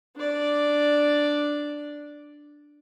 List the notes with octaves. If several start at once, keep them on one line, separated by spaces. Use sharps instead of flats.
D4 D5